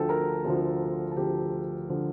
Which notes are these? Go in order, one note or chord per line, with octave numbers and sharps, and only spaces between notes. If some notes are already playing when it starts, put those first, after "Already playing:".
Already playing: D2 D3 F3 A4 G5 A5
A#4 A#5
D2 D3 F3
A5
D2 D3 F3 G4 G5
D3 F3